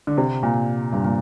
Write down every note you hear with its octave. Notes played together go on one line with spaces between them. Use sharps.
D3
C3
A#2
G2
A#2